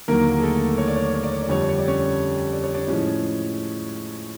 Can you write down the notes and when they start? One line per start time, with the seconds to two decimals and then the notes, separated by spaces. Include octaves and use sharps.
0.08 D#2 D3 F#3 A#3 A#4
0.39 G#4
0.42 A3 A4
0.78 C#5
0.88 D5
0.96 C#5
1.05 D5
1.14 C#5
1.23 D5
1.32 C#5
1.42 D5
1.48 F2 D3 G3 C#5
1.61 D5
1.69 C#5
1.78 D5
1.88 C#4 C#5
2.53 D5
2.64 C#5
2.75 D4 D5
2.88 A2 F3 G#3 C#4 C#5